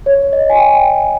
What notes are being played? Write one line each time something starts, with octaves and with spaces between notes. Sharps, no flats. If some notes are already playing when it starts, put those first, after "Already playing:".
C#5
D#5
G#5
G5